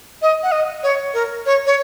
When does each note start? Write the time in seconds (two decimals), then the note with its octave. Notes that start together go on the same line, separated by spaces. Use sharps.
0.22 D#5
0.43 F#5
0.52 D#5
0.83 C#5
1.14 A#4
1.46 C#5
1.66 C#5